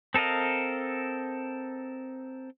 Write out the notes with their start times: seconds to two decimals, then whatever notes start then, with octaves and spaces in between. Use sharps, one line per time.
0.14 C4 A4 A#4 D#5 F5